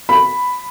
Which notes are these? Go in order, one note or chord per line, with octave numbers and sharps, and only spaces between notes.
B5